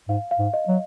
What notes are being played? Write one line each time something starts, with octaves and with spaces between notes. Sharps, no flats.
G#2 F5
F5
G#2
D#5
F#3